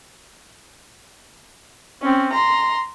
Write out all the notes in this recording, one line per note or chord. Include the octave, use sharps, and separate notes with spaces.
C4 C#4
A#5 C6